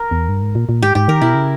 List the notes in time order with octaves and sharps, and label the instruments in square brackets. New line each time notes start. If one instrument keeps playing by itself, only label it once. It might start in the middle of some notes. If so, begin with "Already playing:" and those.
Already playing: [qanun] A#4
[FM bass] E2
G2
G#2
A#2
A#2
[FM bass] G#2 [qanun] G4
[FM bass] G#2 [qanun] G4
[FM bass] D#3 [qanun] A#4
[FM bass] B2 [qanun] E4
[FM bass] C#3